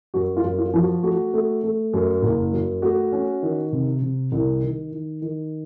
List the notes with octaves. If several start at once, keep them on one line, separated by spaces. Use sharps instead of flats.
F#2 F#4
F4
F#2
F4
F3
F#4
A3 F#4
A3
A3
F#2
F#1
F#2
A3 F#4
C#4
D#3
C3
C3
C2
D#3
D#3
D#3